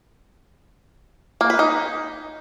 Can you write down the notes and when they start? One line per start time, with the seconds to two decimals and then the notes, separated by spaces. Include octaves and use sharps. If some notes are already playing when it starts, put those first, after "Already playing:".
1.41 A#3
1.50 B4
1.59 D#4